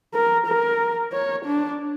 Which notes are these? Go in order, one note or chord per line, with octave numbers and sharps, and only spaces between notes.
A#4
A#4
C#5
D4